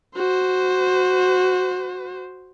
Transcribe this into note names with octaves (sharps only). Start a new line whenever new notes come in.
F#4 C5